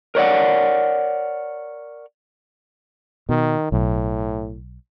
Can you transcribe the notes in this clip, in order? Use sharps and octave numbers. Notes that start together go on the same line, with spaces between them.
A#4 C#5 D5 F#5
B2 D#3
B1 A2